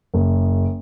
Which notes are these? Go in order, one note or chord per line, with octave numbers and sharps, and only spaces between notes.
F#1